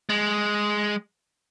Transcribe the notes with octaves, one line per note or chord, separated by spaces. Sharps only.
G#3